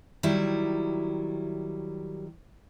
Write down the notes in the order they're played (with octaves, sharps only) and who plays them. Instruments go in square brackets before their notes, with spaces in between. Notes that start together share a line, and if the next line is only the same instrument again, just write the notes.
[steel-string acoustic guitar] D#3 F#3 G3 E4